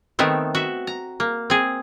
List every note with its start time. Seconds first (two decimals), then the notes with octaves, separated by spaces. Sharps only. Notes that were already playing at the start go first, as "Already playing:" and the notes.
0.19 D#3 A3 B3 C4
0.55 F#4 E5
0.87 A#5
1.20 A#3
1.50 C4 G#4